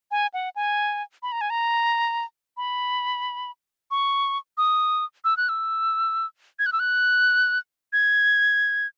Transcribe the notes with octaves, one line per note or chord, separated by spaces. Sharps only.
G#5
F#5
G#5
B5
A#5
G#5
A#5
B5
C#6
D#6
E6
F#6
E6
G#6
F#6
E6
F#6
G#6